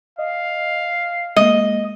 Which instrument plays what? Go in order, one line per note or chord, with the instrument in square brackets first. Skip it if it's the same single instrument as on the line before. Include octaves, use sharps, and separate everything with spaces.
[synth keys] D#5 [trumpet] F5
[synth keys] G#3 A#3 [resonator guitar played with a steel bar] D#5